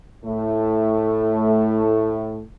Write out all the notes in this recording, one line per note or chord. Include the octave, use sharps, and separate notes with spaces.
A2 A3